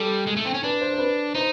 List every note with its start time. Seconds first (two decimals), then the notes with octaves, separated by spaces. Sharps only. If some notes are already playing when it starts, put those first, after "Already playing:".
Already playing: G3 A4
0.27 G#3
0.36 A3
0.45 C4
0.54 C#4
0.63 D4 B4
0.81 C5
0.93 C5
0.98 B4
1.35 D#4 C5